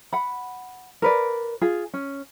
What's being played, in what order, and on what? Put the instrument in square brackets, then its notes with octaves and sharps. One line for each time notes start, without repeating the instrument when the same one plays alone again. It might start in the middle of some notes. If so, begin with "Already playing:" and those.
[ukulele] F#5 B5
A#4 B4 D5
F4 G#4
C#4